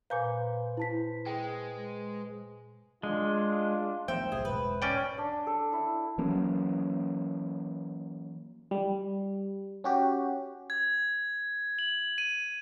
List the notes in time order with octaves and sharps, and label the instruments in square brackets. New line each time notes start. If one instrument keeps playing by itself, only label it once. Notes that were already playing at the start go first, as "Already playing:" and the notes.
[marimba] A#2 G#5 A#5 [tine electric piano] B4 C5 G6 [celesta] F5
[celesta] E4 A5 B6
[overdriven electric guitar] G#3 [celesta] G5
[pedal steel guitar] G#3 [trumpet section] D4 F4
[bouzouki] D#3 E5 [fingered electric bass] F3 A3 B3 [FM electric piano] C5 [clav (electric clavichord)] G5
[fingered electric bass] D1 B1 C4 [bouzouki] G#4
[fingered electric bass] E1 G#2 [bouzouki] B4
[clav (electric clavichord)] C#4 D5 G5
[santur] D4
A4
E4
[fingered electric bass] E3 F#3 A#3 C#4
[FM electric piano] G3
C#4 F#4 G4
[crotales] G#6
F#7
D#7